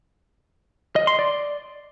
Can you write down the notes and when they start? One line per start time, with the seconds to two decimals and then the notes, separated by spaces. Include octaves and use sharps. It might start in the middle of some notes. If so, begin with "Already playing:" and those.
0.96 D#5
1.07 C6
1.19 D5